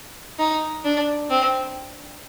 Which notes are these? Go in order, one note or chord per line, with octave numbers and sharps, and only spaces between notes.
D#4
D4
C4